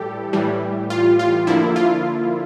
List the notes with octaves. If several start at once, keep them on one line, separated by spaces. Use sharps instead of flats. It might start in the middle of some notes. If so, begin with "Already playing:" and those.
Already playing: A2 E3 G3 G4 A4
A2 E3 G3
F4
F4
D3 F3 A#3 E4
F4